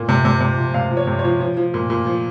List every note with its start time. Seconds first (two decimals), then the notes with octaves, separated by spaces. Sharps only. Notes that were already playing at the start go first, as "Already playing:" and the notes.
Already playing: A#2
0.09 C3
0.25 C3
0.40 C3
0.57 F3
0.74 C3 F5
0.91 F3
0.97 C#5
1.07 C3
1.19 C#5
1.25 F3
1.41 F3
1.57 F3
1.74 A#2
1.90 A#2
2.06 F3